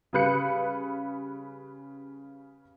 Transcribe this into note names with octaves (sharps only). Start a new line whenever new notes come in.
C#3 G3 B4 F#6 C#7